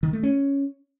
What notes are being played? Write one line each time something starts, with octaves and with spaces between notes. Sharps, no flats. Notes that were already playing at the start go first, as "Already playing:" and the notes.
D#3
A3
C#4